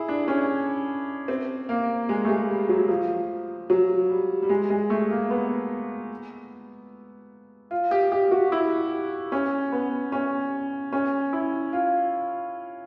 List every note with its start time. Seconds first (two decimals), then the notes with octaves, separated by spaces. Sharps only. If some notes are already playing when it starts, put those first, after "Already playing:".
Already playing: E4 G#4
0.08 D4
0.28 C#4
1.28 C4
1.69 A#3
2.09 G#3
2.25 A3
2.28 G#3
2.49 G3
2.69 F#3
2.89 F3
3.70 F#3
4.09 G3
4.42 G3
4.49 G#3
4.70 G#3
4.90 A3
5.11 A#3
5.30 B3
7.71 F4
7.91 G4
8.12 G4
8.31 F#4
8.52 E4
9.32 C#4
9.72 B3
10.12 C#4
10.92 C#4
11.33 E4
11.73 F4